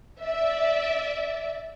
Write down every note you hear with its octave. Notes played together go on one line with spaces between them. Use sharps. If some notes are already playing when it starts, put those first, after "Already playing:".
D5 E5